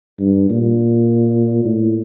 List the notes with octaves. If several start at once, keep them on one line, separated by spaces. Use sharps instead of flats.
G2
A#2
A2